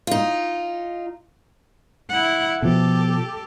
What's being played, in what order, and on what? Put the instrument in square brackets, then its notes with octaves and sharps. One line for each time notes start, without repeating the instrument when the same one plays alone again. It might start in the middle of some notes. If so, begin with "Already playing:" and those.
[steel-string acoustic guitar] D#4 F4
[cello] E4 F#5
[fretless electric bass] B2 F3 [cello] G4 A4